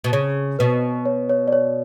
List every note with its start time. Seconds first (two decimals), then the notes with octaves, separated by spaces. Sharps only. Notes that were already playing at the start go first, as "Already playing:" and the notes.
0.04 B2
0.12 C#3 C#5
0.59 B2 B4
1.06 C#5
1.29 C#5
1.48 D5
1.53 C#5